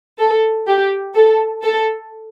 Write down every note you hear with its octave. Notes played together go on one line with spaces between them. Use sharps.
A4
G4
A4
A4